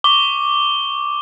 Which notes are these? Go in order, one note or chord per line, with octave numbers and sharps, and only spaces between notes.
C#6 D6 G7